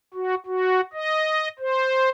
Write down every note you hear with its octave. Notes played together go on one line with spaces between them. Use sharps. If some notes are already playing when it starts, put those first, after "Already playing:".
F#4
F#4
D#5
C5